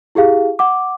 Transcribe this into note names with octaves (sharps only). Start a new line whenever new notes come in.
E4 G4 G#4 F5
F#5 D6